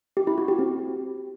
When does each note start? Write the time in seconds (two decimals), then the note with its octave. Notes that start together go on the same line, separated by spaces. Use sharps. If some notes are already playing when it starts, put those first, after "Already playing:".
0.17 G4
0.27 E4
0.38 F#4
0.48 G4
0.59 C4